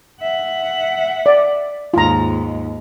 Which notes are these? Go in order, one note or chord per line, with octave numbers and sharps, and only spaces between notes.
E5 F#5
D5
D#2 G#2 F4 A#5